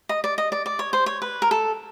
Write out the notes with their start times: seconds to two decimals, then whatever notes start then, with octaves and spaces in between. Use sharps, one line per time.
0.09 D#5
0.24 D5
0.38 D#5
0.52 D5
0.66 D5
0.79 C#5
0.93 C5
1.06 C#5
1.22 B4
1.42 A#4
1.51 A4